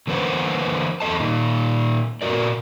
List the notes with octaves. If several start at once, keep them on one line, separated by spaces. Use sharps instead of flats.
D3 E3 A#3 B4 C5 F#5
E2 A4 D#5 A5
A#2 D#3
A#2 G3 F#4 A#4 D5